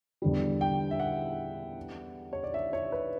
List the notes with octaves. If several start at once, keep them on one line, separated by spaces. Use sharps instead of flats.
E2 D3 G3
G5
E5
F#5
C#5
D5
E5
C#5
B4